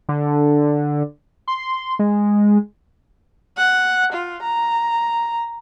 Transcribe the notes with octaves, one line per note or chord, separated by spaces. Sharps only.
D3
C6
G#3
F#5
F4
A#5